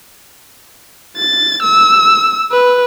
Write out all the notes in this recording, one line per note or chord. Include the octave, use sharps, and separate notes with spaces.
A6
E6
B4